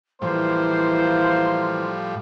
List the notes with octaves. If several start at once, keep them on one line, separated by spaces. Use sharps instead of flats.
A2 E3 F3 G3 A#3 C5 C6